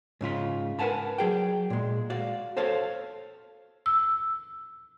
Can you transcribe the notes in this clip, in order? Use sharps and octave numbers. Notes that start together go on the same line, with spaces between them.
G#2 C#3 F4 B5
A#4 B4 F#5 G#5 A5 B5
F#3 G#4 G5
A#2 G#3
F#4 D5 F5
A4 C5 C#5 F5 A5
E6